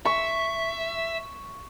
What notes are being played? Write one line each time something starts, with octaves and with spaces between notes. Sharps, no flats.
E5 C#6